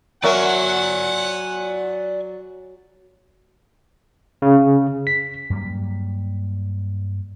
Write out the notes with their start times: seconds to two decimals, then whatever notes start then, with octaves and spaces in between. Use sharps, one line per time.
0.24 F#3 F#4 A#4 D5 E5 F#5 G#5
4.42 C#3
5.07 B6
5.50 G2 F#3 G3 A#3